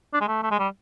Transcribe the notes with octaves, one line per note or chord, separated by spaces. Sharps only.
D4
G#3
A3
A3
G#3
G3